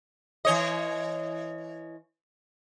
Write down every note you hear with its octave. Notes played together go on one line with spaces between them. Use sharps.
E3 C#5 D#5